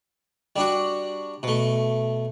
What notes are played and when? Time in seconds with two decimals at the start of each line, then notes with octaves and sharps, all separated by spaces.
0.56 G3 D4 F#4
1.43 B2 A3